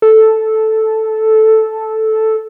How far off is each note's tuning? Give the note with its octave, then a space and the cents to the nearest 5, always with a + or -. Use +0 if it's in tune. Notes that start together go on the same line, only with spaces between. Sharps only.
A4 -5